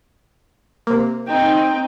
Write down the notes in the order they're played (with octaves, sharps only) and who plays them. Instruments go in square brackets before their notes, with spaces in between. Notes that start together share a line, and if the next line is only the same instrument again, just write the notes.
[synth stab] C3 A#3
[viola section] C4 D#4 [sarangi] G5